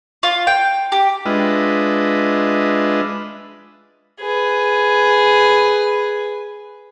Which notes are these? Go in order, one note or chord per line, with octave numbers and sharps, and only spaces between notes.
F4
G5
G4
G#3 D4 F4 B4 D#5 E5
G#4 B4